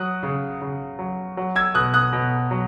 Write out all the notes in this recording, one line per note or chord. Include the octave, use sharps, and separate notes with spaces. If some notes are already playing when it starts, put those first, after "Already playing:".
Already playing: F#3 D#6 F#6
C#3
C#3
F#3
F#3
E6 G#6
B2 D#6 F#6
D#6 F#6
B2
F#3